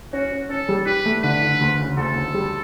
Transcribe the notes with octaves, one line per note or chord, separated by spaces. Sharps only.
C#4 F#4
C#4
C#4 A4
G3
G4 B4
A3
D3 B4
D3
D2
C#3
D2 A4
D2
G3